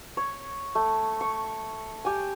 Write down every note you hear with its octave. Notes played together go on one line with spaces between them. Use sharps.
C#5
A3
C#6
G4 G#5